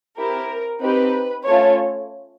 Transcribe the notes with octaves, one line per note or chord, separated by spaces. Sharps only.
C4 E4 G4 A#4
C4 D#4 G4 B4
A3 C#4 F4 A4 C#5